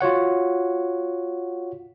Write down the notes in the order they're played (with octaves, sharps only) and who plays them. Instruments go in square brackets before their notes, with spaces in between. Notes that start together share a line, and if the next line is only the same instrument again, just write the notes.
[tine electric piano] F4 F#4 C#5 F#5